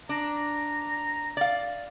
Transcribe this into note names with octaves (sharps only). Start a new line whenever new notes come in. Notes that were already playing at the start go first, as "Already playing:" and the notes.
D4 A#5
D5 F5